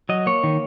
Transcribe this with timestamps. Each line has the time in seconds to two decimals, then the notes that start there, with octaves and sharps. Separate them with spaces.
0.09 F#3 D#5
0.26 A#3 C#5
0.43 D#3